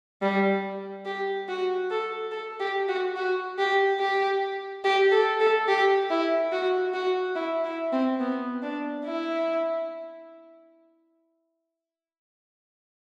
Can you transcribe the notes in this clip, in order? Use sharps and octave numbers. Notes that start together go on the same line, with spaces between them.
G3
G4
F#4
A4
A4
G4
F#4
F#4
G4
G4
G4
A4
A4
G4
E4
F#4
F#4
E4
E4
C4
B3
D4
E4